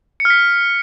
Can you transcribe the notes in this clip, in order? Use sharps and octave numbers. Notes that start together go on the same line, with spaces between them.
C#7
F6
B6